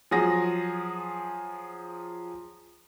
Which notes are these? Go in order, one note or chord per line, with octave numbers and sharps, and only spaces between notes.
F3 F#3 G#4 A#6